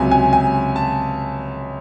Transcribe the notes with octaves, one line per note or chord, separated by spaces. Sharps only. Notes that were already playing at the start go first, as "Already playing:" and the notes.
Already playing: C#2 C3 F#3 G#5
G#5
G#5
A5